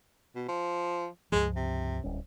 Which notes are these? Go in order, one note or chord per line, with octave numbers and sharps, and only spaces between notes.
B2
F3
C#2 G2 F3 G#3
C3
D1 G3 C#4